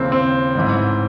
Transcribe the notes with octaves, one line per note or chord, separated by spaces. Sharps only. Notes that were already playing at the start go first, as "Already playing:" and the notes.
Already playing: D#2 C#3 E3 C4
C4
A1 G#2 E3